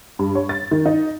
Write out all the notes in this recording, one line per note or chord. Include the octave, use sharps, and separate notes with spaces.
G2
C#5
A6
D#3
D#4